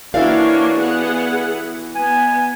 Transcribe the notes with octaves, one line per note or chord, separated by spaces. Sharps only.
E3 A#3 D4 E4 F#4 C#5 D5 F5
B3 G#4 F#5
B3 G#5